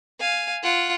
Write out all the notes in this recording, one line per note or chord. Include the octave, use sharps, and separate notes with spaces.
F5 G#5
F4 F#5